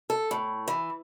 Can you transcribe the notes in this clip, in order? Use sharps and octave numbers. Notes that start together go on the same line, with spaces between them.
A4
A2
E3